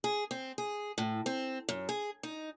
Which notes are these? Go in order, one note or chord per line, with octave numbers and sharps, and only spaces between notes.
G#4
C4
G#4
A2
C4
F#2
G#4
D#4